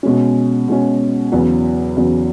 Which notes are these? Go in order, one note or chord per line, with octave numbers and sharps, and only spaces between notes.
B2 G#3 C#4
B2 G#3 C#4
E2 C#3 F#3 B3
E2 C#3 F#3 B3